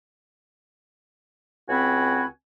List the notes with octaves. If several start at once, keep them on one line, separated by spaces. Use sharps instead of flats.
C#2 C4 F#4 G#5 B5